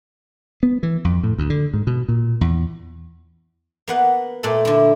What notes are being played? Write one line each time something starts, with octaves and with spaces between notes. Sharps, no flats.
B3
E3
F2
A2
D2
D3
G#2
B2
A#2
E2
A#3 B3 F#5
A#2 A3 A4
D3 E4